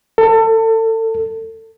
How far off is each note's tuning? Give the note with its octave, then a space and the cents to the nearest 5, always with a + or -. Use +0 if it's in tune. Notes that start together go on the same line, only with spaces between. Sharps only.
A4 +30